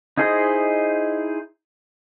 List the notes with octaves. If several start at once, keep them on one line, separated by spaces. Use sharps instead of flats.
D#4 E4 G#4 C5 D#5